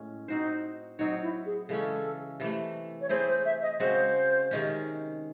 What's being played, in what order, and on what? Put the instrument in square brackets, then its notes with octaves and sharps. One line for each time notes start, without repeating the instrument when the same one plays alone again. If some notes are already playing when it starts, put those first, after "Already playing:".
Already playing: [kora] A2 G#3 C#4
[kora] C4 F#4 C5 [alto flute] D#4
[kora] F#3 C4 F#4 C#5 [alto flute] D#4
[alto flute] E4
G#4
[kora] C#3 E3 G#3 C#4 [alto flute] A4
[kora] C3 E3 A3
[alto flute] C#5
[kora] A3 C4 E4 G#4 [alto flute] C5
[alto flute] C5
E5
D#5
[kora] C#3 G#3 C4 F#4 [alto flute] C5
[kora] C3 D#3 G#3 C#4